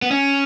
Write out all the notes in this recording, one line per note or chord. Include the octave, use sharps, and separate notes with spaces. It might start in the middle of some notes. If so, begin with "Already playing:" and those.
B3
C#4